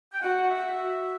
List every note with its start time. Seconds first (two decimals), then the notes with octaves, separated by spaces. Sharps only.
0.12 G5
0.22 F#4 F#5
0.50 E5